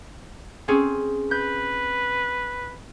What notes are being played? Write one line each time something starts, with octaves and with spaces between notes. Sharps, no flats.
C4 C#4 G#4
B4 G6